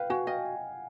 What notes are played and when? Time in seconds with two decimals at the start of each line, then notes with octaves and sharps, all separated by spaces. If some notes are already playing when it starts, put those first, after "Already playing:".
Already playing: B4 F5 G5
0.10 F#4 F#5 G#5
0.27 D#5 F5 G5